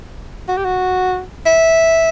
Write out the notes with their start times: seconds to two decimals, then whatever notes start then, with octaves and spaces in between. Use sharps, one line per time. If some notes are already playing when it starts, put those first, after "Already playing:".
0.48 F#4
0.57 G4
0.65 F#4
1.46 E5